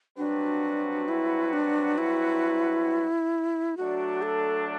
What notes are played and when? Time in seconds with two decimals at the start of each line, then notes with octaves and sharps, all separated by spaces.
0.18 G2 F#3 C4 D4 F#4 B4
1.09 E4
1.53 D4
1.98 E4
3.77 F#3 A3 D4 F#4
4.22 A4